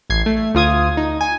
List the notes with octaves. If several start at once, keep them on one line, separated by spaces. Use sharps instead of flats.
A1 G#6 C7
A3
D2 F4 D#6 G#6
D#4
G#5